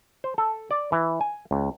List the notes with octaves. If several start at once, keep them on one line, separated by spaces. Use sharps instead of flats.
C5
A4
D5
E3
G#5
C#2